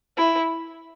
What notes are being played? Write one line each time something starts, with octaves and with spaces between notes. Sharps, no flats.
E4